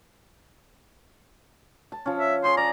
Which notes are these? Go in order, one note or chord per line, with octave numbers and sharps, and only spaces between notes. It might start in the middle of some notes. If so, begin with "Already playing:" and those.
A5
F3 C#4
E5
G#4 C#5 C6
D5 A#5